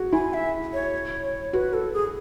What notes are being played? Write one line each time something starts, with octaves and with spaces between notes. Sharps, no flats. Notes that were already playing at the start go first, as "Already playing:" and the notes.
Already playing: F#4 G#4
E4 G#5
E5
C#5
F#4 B4
A4
G#4